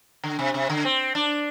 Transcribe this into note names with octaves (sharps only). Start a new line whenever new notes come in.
D3
C3
C3
D3
C4
D4